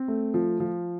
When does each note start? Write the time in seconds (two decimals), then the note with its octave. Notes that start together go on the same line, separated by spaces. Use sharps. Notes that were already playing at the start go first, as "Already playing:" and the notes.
Already playing: C4
0.08 A3
0.34 F3
0.60 F3